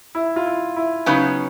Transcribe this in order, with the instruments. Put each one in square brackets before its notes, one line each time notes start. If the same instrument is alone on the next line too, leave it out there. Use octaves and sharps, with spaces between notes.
[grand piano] E4
F4
E4
E4
[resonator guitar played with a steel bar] C#3 F#3 B3 D#4 [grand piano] C#4